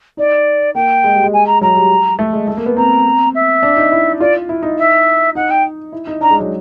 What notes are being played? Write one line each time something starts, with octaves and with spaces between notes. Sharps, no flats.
D#4 D5
A#3 G5
G#3
G3
G#3
G#5
A#5
F#3 A#5
G3
A3
G#3
A3
A#3
B3
C4 A#5
E5
D4
D#4
E4
F4 D5
E4
D#4
E5
D#4 F#5
G5
E4
D#4
D4 A#5
G#3
F#3